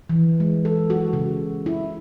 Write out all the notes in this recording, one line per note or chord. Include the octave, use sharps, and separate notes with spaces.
E3
G#3
A4
F#4
C#3
E4